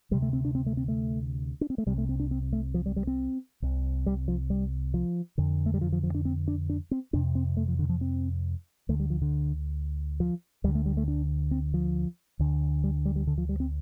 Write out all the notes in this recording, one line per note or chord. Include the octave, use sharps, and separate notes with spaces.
D2 C3 G3
A3
C4
D4
C4
A3
C4
A3
D4
C4
A3
C2 C3 G3
A3
C4
D4
C4
A3
F3
G3
G3
C4
C2 C3
G3
F3
G3
F3
F2 D3
A3
G3
F3
F3
F3
D4
C4
D4
D4
C4
F2 C3 D4
C4
A3
F3
D3
F3
C4
D2 D3 A3
G3
F3
D3
F3
D2 D3 G3
A3
G3
A3
D4
C4
F3
D2 D3
G3
G3
G3
D3
F3
G3
C4